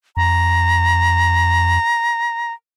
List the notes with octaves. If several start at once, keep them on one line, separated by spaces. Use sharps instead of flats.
F2 A#5